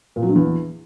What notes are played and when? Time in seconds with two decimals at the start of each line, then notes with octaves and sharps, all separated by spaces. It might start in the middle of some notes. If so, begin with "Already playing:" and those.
0.16 A#2
0.22 F#3
0.29 G2
0.35 E2